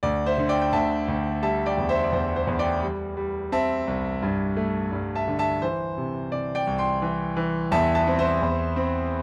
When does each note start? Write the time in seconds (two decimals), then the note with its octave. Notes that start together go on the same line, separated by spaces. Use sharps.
0.03 D2 D5
0.26 C5 E5
0.38 D3
0.49 D5 G5
0.62 G5
0.73 D2 E5 A5
1.08 D2
1.42 G3 E5 A5
1.66 D5 G5
1.78 E2
1.89 C5 E5
2.04 D5
2.13 E2 C5
2.36 C5
2.47 E2
2.59 D5 G5
2.82 G3
3.17 G3
3.52 C4 E5 A5
3.87 C2
4.22 G2
4.57 A3
4.92 G2
5.15 E5 A5
5.27 D3
5.39 E5 A5
5.62 E3 C5
5.98 C3
6.32 C3 D5
6.55 D5 G5
6.67 C2
6.79 G5 C6
7.02 E3
7.37 E3
7.72 E2 E5 A5
7.95 E5 A5
8.07 C4
8.19 C5 E5
8.42 E2
8.76 C4